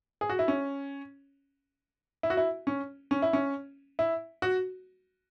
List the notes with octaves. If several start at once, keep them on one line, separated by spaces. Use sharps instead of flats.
G#4
F#4
E4
C#4
E4
F#4
E4
C#4
C#4
E4
C#4
E4
F#4